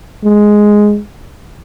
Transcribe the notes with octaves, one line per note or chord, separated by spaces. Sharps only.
G#3